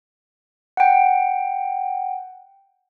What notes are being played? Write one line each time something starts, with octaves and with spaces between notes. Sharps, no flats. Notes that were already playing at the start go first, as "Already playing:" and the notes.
F#5 G5